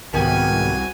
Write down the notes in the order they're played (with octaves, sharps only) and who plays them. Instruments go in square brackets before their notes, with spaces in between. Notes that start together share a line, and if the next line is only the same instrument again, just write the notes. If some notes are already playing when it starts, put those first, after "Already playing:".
[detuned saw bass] C2 [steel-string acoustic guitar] G#2 D#3 B3 [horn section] F#4 G#5 [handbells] A#4 G5